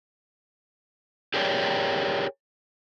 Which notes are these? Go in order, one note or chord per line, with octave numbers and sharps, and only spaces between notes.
G4 G#4 A#4 C#5 D5 G5